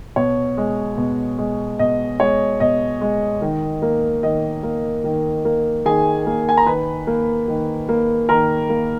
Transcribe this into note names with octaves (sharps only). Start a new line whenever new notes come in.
B2 C#5
G#3
B2
G#3
B2 D#5
G#3 C#5
B2 D#5
G#3
D#3
A#3
D#3 D#5
A#3
D#3
A#3
D#3 G#4 G#5
A#3
G#5
A#5
D#3 B4 B5
A#3
D#3
A#3
D#3 A#4 A#5
A#3